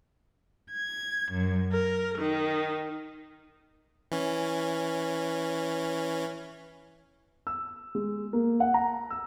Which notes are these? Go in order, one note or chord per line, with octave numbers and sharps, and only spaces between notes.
G#6
F#2
A#4
D#3
E3 C#4
E6
G#3
A#3
F#5
A#5
E6